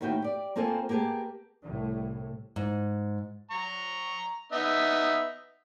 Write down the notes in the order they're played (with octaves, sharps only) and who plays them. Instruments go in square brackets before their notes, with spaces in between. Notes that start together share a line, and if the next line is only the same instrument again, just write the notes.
[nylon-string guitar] D#2 A2 B3 F#4 G5
G4 D5
A#3 C4 F4 A4 A#4 G#5
A#3 B3 G4 G#4 A5
[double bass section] C2 A2
[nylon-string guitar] G#2
[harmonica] A#5 C#6
B3 D#4 E5